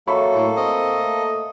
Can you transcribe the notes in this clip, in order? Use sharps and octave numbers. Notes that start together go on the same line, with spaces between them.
F#3 A#3 A4 E5 B5 C#6
A2
C4 D#5
A3